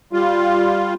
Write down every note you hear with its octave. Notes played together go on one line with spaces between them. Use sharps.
G3 F4